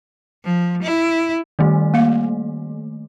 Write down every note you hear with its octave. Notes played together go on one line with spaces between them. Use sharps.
F3
E4
D#3 G3 A3
A#3 F5